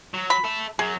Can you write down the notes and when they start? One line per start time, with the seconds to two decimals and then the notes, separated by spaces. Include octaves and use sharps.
0.14 F#3
0.30 B5
0.44 A4 E5
0.79 F#2 F#3 G#4